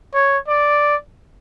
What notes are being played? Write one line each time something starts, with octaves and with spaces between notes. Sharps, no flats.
C#5
D5